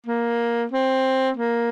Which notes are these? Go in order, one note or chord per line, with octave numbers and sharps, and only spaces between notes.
A#3
C4
A#3